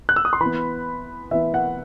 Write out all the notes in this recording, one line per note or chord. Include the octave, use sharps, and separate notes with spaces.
F#6
E6
D#6
C6
E3 B3 B5
E3 B3 E5
F#5